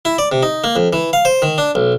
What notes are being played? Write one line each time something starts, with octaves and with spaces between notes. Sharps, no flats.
E4
D5
C3
D#4
A#3
F2
E3
F5
C5
D#3
D4
B1